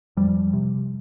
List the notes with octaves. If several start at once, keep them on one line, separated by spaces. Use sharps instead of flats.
F2 F3 G3
C3